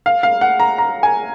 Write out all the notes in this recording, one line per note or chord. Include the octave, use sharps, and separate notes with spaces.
F5
F5
F#5
A#5
A#5
G#5